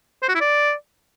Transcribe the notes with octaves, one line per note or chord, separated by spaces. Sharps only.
C5
F#4
E4
D5